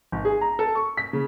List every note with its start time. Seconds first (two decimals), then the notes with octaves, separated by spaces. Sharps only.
0.12 G#1
0.25 G#4
0.41 A#5
0.59 A4
0.75 C#6
0.97 B6
1.13 C#3